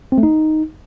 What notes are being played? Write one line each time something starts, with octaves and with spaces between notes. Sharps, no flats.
C4
A3
D#4